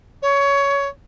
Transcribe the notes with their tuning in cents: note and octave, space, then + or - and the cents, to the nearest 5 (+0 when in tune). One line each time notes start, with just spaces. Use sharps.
C#5 +15